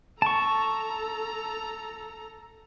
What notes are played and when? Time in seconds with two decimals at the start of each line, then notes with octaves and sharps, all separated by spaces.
0.22 A4 A5 A#5 C#6